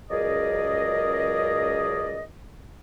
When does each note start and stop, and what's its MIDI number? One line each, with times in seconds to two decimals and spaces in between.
0.11 2.24 37
0.11 2.24 42
0.11 2.24 68
0.11 2.24 70
0.11 2.24 74
0.11 2.24 75